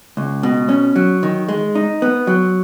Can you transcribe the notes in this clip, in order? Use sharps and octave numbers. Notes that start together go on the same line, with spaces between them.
C#2
B2
C#4
F#3
D#3
G#3
D#4
B3
F#3